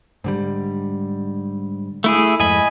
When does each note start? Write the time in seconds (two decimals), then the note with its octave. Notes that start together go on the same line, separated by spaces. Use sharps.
0.24 G#2 D3 G3
2.04 A3 E4 G#4
2.40 F2 G#2 D#5 G#5 B5